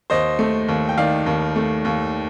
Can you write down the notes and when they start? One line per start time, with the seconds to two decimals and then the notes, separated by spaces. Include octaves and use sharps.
0.10 D#2 C5 D#5
0.39 A3
0.68 D#2
0.89 G5
0.97 D#3 D5 F5
1.26 D#2
1.56 A3
1.85 D#2